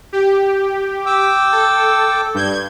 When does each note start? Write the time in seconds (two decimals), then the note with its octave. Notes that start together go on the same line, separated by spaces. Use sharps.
0.13 G4
1.06 G5 D6 E6
1.52 A4
2.35 G2 G6 G#6